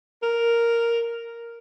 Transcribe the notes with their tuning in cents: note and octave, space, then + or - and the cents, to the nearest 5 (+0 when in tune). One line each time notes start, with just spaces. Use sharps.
A#4 +0